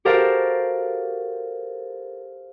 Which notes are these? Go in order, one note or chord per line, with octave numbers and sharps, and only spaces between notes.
F#4 G4 A4 A#4 C5 F5